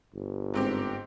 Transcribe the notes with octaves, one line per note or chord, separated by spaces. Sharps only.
G1
G#2 C4 G4